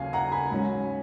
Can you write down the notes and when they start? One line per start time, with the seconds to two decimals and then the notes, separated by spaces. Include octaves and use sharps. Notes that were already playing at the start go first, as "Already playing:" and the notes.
Already playing: D#2 C#3 F#3 F5 G#5
0.13 F#5 A#5
0.32 G#5 B5
0.51 G#2 F#3 C#4